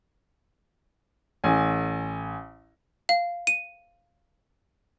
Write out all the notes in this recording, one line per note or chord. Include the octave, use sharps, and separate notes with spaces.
A1 G#5
F5
D#7